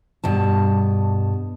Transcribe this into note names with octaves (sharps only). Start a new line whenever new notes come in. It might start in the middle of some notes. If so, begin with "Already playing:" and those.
G2 B2 A5